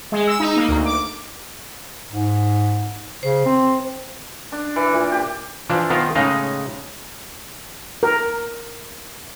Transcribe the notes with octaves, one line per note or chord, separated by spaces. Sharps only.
G#3
E6
D#4
A#3
D2
D6
G#2
C#3 C5
C4
D4
E3
A#2
G4
E3 F3 D4
D#3 B3 F4 A#4 C5
A2 C#3 G#3 D#4 D#5 F5
A#4